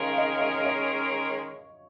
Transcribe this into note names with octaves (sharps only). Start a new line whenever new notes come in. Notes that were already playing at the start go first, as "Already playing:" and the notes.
Already playing: D#3 G#3 C#4 A#4 D#5 F5
D#5
D#5
C#5